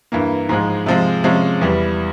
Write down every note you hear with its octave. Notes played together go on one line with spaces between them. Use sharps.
G2 E3 A#3
G#2 F3 G#3
C3 F3 G#3
C3 F3 G#3 C#4
E2 E3 G3